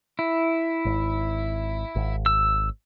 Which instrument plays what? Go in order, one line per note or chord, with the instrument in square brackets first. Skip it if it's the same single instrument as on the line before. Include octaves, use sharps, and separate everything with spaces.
[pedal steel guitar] E4
[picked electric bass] G#1
G#1
[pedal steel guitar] E6